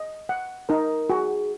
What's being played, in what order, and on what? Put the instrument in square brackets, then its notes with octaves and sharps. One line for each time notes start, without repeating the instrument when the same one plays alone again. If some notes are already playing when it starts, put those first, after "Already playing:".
Already playing: [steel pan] D#5
F#5
[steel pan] D#4 [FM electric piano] A#4
[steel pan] F#4 [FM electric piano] G#4